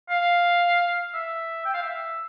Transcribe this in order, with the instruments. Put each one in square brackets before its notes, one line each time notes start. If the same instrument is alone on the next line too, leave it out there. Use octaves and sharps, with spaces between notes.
[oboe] F5
E5
G5
F5
E5